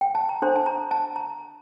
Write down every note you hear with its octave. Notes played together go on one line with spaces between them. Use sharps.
G5
A5
A#5
D4 A4 C5 C6
A5
A#5
A5
A#5